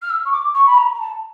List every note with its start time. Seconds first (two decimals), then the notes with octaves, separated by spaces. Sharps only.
0.02 F6
0.10 E6
0.25 C#6
0.32 D6
0.54 C#6
0.66 B5
0.77 A#5
0.94 A#5
1.00 A5